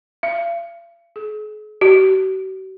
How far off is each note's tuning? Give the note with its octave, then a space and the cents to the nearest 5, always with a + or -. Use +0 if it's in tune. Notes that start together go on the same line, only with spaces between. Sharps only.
F5 -40
G#4 +40
F#4 +45